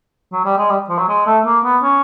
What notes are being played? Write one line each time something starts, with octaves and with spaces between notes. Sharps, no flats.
F#3
G3
G#3
G3
F3
F#3
G#3
A3
A#3
B3
C#4